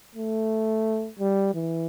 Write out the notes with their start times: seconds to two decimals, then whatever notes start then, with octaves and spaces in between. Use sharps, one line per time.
0.15 A3
1.20 G3
1.55 E3